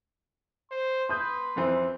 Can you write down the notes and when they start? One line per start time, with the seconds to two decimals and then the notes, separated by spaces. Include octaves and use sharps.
0.71 C5 C6
1.09 B4 D#6 G6
1.56 F2 E3 C4